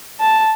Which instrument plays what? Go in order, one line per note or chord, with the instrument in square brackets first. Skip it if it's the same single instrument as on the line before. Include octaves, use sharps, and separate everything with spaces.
[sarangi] A5